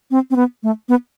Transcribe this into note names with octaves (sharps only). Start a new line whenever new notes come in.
C4
C4
B3
A3
B3